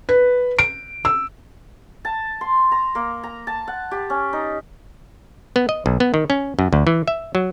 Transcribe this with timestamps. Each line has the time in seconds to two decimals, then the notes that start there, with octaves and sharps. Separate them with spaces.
0.09 B4
0.59 D7
1.05 E6
2.05 A5
2.41 C6
2.72 A#5
2.95 A#3
3.23 A#5
3.47 A5
3.68 F#5
3.91 G4
4.10 C#4
4.33 D#4
5.56 B3
5.69 D#5
5.86 B1
6.00 B3
6.14 D#3
6.30 C#4
6.59 F#2
6.73 D2
6.87 E3
7.08 E5
7.35 F#3